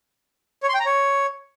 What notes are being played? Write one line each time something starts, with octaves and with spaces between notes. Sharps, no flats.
C#5
C6
G5
A#5
C#5